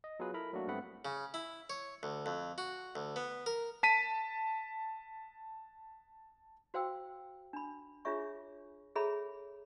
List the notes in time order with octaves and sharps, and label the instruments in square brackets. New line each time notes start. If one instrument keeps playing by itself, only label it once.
[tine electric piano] D#5
F#3 B3 F4 G#4 B4
E4 A4 A#4 A#5 B5
F#3 A3 A#3 D4 F#4
G2 A3 B3 C4 F#5 B5
[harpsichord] C#3
E4
C#5
D2
F2
F#4
D2
B3
A#4
[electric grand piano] A5 B6 D#7
[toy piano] F#4 C5 F5 G5 E6
D4 B5
D4 F4 G#4 C#5 E5 C#6
G#4 A4 C#5 E5 A#5 B5